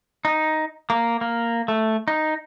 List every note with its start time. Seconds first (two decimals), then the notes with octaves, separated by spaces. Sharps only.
0.25 D#4
0.90 A#3
1.21 A#3
1.68 A3
2.08 D#4